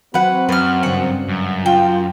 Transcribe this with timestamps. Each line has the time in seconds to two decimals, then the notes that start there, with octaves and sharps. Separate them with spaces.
0.14 F#3 C4 F#4 B4 F#5
0.49 F#2 B4 F6
0.83 G2 C#3 F#5
1.28 F#2
1.66 F4 G5